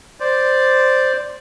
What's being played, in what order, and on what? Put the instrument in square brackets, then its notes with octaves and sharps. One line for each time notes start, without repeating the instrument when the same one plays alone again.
[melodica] C5 D5